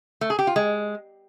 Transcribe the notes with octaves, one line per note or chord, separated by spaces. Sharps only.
A3
G#4
G4
F4
G#3